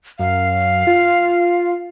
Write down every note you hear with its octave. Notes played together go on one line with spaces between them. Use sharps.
F#2 F5
F4